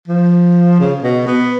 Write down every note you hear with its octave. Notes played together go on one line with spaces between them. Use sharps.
F3
C#3
B2
B3